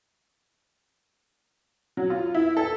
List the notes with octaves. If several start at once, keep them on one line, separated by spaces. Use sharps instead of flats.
F#3
F4
E4
A4